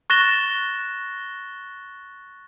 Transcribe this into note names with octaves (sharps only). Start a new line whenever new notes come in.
C#6 F#6 A6 A#6 E7 G7